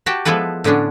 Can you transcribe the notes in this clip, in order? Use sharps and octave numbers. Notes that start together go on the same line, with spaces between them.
F#4 G4 G5 A5
F3 G#3 B3 E4 A4 B4
A2 D3 B3 C#4 D4